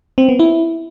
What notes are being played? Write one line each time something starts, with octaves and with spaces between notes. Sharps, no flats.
C4
B3
E4